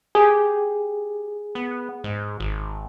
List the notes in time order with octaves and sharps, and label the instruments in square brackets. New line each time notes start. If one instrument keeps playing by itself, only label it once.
[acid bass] G4 [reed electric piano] G#4
[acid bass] B3
G#2
G#1